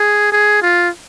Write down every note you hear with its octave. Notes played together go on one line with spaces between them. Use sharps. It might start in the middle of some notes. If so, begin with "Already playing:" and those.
Already playing: G#4
G#4
F4